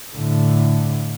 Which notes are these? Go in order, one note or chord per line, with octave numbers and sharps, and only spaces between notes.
A2 D3